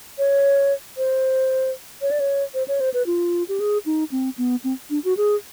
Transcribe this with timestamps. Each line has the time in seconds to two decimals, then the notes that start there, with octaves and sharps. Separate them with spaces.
0.18 C#5
0.97 C5
2.02 C#5
2.11 D5
2.20 C#5
2.54 C5
2.68 C#5
2.80 C5
2.94 B4
3.06 F4
3.48 G4
3.60 G#4
3.86 D#4
4.11 C4
4.38 B3
4.64 C4
4.90 D4
5.04 F#4
5.17 G#4